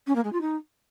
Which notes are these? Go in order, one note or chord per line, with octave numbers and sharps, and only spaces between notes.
C#4
A#3
G#3
F4
D#4